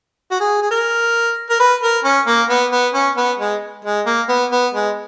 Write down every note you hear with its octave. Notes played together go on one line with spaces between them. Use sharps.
F#4
G#4
G#4
A#4
A#4
B4
A#4
C#4
A#3
B3
B3
C#4
B3
G#3
G#3
A#3
B3
B3
G#3